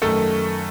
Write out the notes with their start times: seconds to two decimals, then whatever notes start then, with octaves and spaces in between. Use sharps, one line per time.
0.02 F#2 D#3 A3 A4